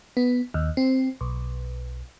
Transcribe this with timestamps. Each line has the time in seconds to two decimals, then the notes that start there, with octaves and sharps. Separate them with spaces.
0.17 B3
0.54 D#2
0.77 C4
1.21 B1